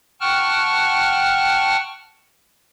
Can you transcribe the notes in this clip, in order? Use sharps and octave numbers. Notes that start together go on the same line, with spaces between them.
F#5 G5 A5 C#6 F6 F#6